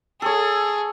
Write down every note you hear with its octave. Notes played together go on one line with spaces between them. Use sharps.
G#4 A4 C#5